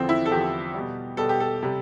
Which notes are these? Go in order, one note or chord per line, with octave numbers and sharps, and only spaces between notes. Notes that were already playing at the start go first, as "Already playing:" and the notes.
Already playing: E2 D3 F3 C4
E4
A4
E2 D3 F3 G4
B2 G3
B2 G3 A4
G4
A4
C3 G3